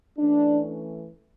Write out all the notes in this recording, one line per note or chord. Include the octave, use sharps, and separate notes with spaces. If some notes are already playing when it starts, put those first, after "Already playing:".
E3 A3 C#4 D4